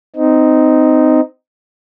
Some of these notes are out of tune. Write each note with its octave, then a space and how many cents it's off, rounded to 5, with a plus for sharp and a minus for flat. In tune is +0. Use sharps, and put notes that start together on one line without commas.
C4 -20 D#4 +0